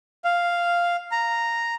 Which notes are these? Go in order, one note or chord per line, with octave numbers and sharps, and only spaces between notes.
F5
A#5